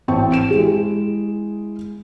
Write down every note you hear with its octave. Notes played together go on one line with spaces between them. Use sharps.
A1 C4 G5 A5 C#6
D7 E7
G#3 E4 G#4